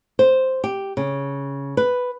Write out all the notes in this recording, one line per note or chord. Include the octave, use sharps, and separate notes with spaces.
C5
G4
C#3
B4